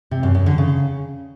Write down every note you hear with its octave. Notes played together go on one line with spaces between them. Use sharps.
C3
F#2
F#2
D3
C#3